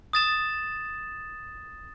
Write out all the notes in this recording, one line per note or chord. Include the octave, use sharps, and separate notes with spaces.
D#6 A6 E7